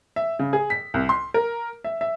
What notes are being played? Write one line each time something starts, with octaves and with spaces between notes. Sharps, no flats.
E5
C#3
G#4
B6
C2
C6
A#4
E5
E5